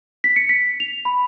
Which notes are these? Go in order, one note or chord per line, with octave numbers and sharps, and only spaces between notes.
B6
C#7
B6
F7
B5